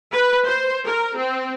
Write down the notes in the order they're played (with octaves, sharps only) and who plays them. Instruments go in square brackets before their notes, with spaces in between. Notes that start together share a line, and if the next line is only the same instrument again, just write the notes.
[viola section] B4
C5
A#4
C4